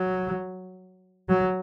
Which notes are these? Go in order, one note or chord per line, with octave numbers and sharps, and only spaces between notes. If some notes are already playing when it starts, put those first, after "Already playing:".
Already playing: F#3
F#3